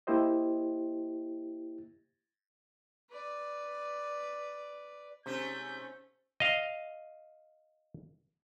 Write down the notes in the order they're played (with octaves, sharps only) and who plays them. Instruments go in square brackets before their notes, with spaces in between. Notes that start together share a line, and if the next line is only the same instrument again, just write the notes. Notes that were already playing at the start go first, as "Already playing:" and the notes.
[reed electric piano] A#3 E4 G4 C5 D#5
[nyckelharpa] B4 D5
[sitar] G#2 A3 C#4 [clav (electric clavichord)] C3 [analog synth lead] C5 [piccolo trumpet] G6
[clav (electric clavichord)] D#5 F5